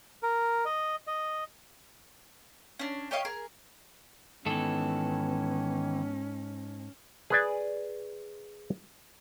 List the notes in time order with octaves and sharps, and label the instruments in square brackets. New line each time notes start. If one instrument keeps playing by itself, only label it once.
[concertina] A#4
D#5
D#5
[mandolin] C#4 D4
G4 C#5 D#5 F5
G#4 A#4
[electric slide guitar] G#2 A4 [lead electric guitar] D#3 E3 [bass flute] B3 [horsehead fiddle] C#4
[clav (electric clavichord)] G#4 B4 D5